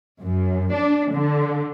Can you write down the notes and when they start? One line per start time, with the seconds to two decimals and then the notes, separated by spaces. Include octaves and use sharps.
0.22 F#2
0.75 D4
1.12 D3